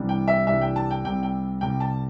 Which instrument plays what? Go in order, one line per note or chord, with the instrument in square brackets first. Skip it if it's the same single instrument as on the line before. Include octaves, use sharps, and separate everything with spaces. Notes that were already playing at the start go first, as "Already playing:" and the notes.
Already playing: [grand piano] C2 C3 E3 G3 D4
[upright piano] G5
E5
[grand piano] C2 C3 E3 G3 D4 [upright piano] E5
[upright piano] G5
A5
G5
[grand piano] C2 C3 G3 [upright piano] G5
[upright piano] G5
[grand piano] C2 C3 G3 [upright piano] G5
[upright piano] A5